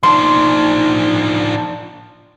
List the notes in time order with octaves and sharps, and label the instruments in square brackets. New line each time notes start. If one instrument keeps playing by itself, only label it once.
[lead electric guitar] F3 D4 [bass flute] D#4 [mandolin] C6